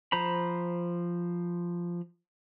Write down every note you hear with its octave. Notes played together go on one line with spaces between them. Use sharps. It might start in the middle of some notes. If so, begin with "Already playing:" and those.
F3 C5 A#5 B5